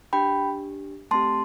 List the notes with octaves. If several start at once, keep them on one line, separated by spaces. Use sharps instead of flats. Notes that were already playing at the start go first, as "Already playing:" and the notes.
D4 G4 G5 B5
A3 C4 G4 A5 C6